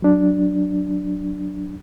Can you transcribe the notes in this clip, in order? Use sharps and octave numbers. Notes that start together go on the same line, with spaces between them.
F#3 D4